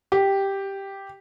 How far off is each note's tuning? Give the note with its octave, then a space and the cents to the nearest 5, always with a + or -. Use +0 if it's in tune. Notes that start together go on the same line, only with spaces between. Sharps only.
G4 +0